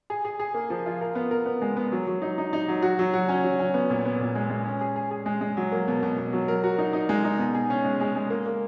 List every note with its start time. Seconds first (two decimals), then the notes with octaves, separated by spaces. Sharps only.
0.10 G#4
0.25 G#4
0.39 G#4
0.54 A#3
0.70 F3
0.86 F4
1.01 A#4
1.15 B3
1.31 A#4
1.46 B3
1.62 G#3
1.76 B3
1.92 F#3
2.07 F#3
2.22 D#4
2.38 D#4
2.53 D#4
2.68 F#3
2.82 F#4
2.99 F#3
3.14 F#4
3.29 C#4
3.44 F#3
3.59 C#4
3.74 B3
3.90 A#2
4.05 B3
4.20 A#2
4.35 G#3
4.50 G#3
4.65 C#4
4.81 G#4
4.96 G#4
5.11 G#4
5.26 G#3
5.41 G#3
5.57 F#3
5.72 A#3
5.88 B2
6.03 B2
6.18 B2
6.33 F#3
6.48 A#4
6.64 F#4
6.78 D#4
6.93 D#4
7.09 G#3
7.25 D#4
7.39 B2
7.54 G#4
7.70 C#4
7.84 G#3
8.01 G#3
8.16 G#3
8.30 A#3
8.46 A#3